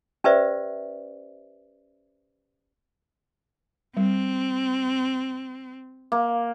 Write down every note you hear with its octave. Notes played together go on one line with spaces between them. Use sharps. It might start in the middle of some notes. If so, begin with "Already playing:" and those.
C#4 G4 B4 C5 D5 E5
G3 C4
A#3